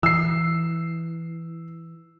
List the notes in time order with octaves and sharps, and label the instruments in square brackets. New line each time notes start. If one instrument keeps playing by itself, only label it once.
[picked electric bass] E3 [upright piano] E6 C7